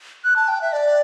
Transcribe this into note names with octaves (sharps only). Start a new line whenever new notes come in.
F#6
A5
G5
E5
D5